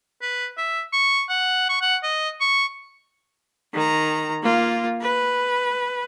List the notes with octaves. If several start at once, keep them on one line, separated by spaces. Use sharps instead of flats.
B4
E5
C#6
F#5
C#6
F#5
D#5
C#6
D#3 A#5
A#3 F4
B4